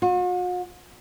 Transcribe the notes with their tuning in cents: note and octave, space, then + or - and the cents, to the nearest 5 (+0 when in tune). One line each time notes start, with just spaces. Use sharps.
F#4 -45